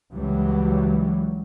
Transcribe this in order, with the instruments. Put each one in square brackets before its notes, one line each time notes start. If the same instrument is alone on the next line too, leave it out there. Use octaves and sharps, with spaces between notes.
[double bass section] C#2 E3 F#3 G3